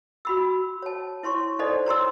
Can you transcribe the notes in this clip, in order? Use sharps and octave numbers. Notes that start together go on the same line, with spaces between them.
F#4 B5 E6
C#5 A5
E4 C#5 C6 C#6
D#4 A4 C5 D5 D#5
C#5 A#5 C6 E6